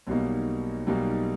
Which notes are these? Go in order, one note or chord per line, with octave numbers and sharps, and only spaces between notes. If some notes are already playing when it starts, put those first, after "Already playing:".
B1 B2 G3 A#3 D#4
B1 B2 G3 A#3 D#4